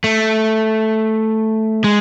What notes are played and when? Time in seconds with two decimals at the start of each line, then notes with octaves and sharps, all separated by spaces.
0.04 A3
1.84 G#3